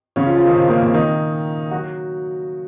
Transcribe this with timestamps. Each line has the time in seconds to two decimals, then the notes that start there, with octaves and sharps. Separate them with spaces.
0.16 C#3 C#4
0.26 F3 F4
0.36 F3 F4
0.45 D#3 D#4
0.55 C3 C4
0.68 A#2 A#3
0.81 C3 C4
0.94 D#3 D#4
1.71 F#3 F#4